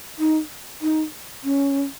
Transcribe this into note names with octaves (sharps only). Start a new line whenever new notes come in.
D#4
D#4
C#4